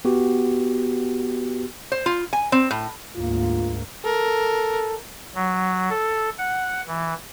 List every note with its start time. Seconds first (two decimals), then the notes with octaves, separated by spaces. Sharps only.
0.05 B3 F#4 G4
1.92 C5
2.06 F4
2.33 G#5
2.52 C4
2.71 A2
3.15 D2 G#2 A#3 F4
4.05 A4 A#4
5.35 F#3
5.90 A4
6.38 F#5
6.87 E3